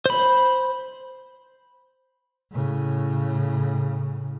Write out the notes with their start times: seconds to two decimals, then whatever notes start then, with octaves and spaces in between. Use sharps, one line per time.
0.06 C5 B5
2.52 A2 C#3